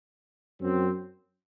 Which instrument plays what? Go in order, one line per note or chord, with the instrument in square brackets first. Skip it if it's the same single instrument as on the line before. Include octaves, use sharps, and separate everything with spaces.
[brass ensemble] F#2 F#3 C4